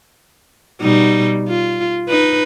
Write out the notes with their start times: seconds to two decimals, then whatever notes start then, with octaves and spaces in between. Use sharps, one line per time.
0.81 B2 G3 D#4
1.48 F4
2.09 D#4 B4